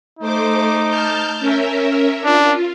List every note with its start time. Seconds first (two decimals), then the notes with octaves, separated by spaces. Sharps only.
0.19 A3 D#4 C5 D6
0.89 A5 F6 G6
1.39 C#4 A#4 E5
2.25 D4 F4